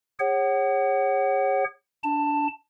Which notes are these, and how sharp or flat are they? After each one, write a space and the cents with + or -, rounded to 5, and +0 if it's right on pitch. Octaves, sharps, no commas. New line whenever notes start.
G#4 -40 C#5 -25 F#5 +30
D4 -15 A5 +10